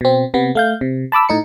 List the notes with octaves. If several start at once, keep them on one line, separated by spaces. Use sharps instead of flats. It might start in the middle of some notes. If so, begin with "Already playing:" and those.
B2 C4
C3 B3
A3 F5 G6
C3
A5 B5 D6 E6
A2 D#4 C#7